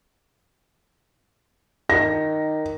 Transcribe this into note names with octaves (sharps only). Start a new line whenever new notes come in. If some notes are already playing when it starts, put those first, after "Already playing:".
D#3 A#6